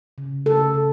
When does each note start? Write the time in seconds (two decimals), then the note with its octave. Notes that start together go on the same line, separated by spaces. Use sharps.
0.18 C#3
0.46 C#3 A4
0.74 C#3